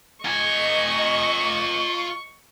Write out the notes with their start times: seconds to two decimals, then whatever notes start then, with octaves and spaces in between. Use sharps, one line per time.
0.25 F4 D#5 G#5 C#6